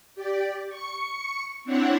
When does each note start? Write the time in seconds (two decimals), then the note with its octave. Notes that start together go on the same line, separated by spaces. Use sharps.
0.15 G4 D5
0.69 C#6 C#7
1.65 C4 D4 E4 C#5 F#5